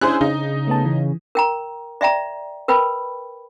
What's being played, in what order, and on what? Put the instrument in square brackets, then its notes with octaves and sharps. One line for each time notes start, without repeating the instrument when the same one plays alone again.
[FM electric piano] C#4 D4 [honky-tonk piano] E4 G#4 C5 [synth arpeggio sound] F#6
[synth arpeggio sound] C#3 [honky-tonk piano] D#4
[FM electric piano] A3 B3 A5
E3
[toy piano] A#4 G5 A#5
D5 E5 G5 A#5
A#4 B4 G5 B5